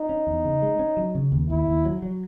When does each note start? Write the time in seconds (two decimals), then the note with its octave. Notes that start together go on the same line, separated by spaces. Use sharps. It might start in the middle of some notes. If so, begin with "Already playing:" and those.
Already playing: D#4
0.09 C#4
0.27 E2
0.44 C#3
0.62 G#3
0.79 C#4
0.97 F#3
1.15 C#3
1.32 D#2
1.50 D#2 E4
1.67 D#2
1.85 F#3
2.02 F#3